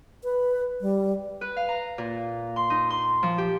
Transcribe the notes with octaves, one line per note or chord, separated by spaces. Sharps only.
B4
G3
B4
F5
A#5
A#2
C6
D#4
C6
F3
G4